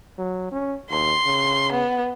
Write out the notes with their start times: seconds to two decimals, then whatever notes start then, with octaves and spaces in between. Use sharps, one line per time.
0.18 F#3
0.51 C#4
0.90 D#2 C6
1.26 C#3
1.72 B3